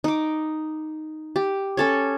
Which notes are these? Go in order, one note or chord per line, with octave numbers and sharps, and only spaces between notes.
D#4 D6
G4
C#4 A4 C#5